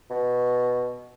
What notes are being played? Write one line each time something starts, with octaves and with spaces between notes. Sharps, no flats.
B2